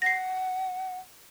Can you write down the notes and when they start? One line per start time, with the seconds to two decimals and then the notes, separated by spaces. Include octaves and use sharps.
0.02 F#5 A#6 C7